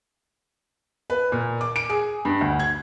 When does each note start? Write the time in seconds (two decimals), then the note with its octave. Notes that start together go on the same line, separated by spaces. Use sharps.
1.10 B4
1.32 A#2
1.61 D6
1.76 D7
1.89 G#4
2.25 G2
2.41 D2
2.59 G#6